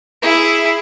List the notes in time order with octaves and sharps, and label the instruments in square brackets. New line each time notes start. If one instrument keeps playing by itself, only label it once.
[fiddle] E4 G#4